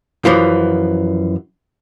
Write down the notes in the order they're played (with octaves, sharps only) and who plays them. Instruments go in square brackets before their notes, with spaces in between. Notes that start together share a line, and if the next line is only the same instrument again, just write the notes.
[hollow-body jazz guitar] F#2 E3 F3